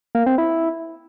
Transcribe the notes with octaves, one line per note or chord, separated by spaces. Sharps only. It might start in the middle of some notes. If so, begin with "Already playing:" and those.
A#3
C4
E4